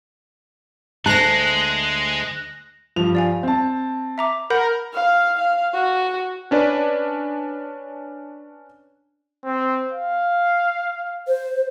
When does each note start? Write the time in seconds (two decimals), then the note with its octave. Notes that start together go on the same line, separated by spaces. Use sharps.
1.06 D2 G#3 A5 F#6 A#6
2.96 G2 F3 F7
3.15 D5 F5 G#5
3.43 C4 A5
4.18 E5 A#5 D6
4.50 A#4 F#5 B5 G6
4.94 F5
5.38 F5
5.75 F#4
6.51 C#4 D4 B4 D5
9.45 C4
9.92 F5
11.27 C5